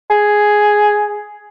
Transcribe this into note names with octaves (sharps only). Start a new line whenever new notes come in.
G#4